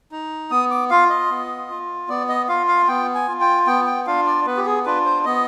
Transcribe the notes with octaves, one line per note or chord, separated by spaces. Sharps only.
D#4
B3 D#6
D6
F4 F5
D#5
B3
F4
B3 D5
D#5
F4 F5
F5
B3 G5
G#5
F4
G5
B3 G5
G5
D4 F4 F5
D5
B3 B4
G4
G#4
D4 F4 B4
C5
B3 D#5